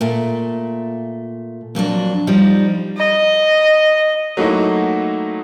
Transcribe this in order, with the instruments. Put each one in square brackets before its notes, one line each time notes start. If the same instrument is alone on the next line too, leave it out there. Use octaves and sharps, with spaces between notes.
[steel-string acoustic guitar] A#2 A3
F2 A#2 F#3 D4
F3 G3 D#4
[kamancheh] D#5
[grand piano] F#3 A3 A#3 D#4 E4 F#4